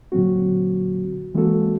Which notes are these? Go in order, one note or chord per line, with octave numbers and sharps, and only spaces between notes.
A#2 D3 F#3 A#3 C4 F#4
E3 G#3 A#3 C4 F#4 A4